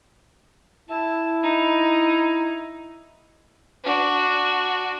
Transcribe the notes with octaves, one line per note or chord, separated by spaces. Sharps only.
E4 A5
D#4
D4 F#4